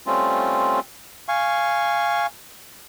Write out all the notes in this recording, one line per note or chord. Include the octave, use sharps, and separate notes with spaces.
G3 A3 C4 C#4 F4
F5 G#5 C#6